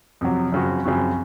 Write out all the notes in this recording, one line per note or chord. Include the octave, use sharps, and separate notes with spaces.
F2 C3 F#3
F#2 C#3 F3 C4 F#4
F#2 C#3 F3 C4 F#4